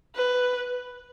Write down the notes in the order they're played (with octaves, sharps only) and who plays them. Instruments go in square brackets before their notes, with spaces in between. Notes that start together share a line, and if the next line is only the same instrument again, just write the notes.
[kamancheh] B4